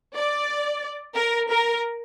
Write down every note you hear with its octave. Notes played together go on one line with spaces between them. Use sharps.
D5
A#4
A#4